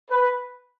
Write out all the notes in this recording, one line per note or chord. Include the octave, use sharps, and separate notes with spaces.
B4